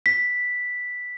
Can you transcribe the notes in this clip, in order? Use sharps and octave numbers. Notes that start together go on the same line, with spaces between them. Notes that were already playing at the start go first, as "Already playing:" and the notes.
B6